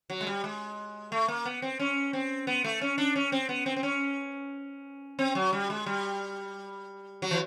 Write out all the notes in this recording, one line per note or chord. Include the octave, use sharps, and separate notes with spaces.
F#3
G#3
G3
G#3
A3
A#3
B3
C4
C#4
C4
B3
A3
C#4
D4
C#4
C4
B3
C4
C4
C#4
C4
F#3
G3
G#3
G3
F#3
E3